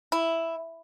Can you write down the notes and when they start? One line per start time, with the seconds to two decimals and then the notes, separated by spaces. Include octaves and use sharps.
0.12 E4